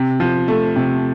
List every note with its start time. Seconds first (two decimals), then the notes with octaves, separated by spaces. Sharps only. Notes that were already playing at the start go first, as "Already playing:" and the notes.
Already playing: C3
0.20 F3
0.48 A3
0.76 C3